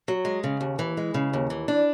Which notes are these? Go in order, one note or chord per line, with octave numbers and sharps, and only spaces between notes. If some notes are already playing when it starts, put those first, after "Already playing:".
F#3
G#3
C#3
D#2
E3
G#3
C#3
D#2
E3
D4